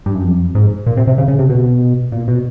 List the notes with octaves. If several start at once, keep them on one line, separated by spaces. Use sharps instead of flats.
G2
F#2
F2
G#2
A#2
C3
C3
C#3
C#3
C3
B2
A#2
B2